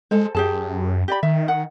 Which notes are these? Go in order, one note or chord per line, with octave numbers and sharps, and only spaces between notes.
G#3 A4 C5
F#2 G4 G#4 A5
G4 D5 B5
D#3 E5
F#5